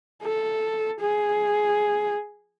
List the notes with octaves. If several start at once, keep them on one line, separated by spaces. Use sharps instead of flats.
A4
G#4